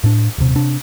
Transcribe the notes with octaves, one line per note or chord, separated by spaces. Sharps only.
A2 D4
D#1 C3
C3 D4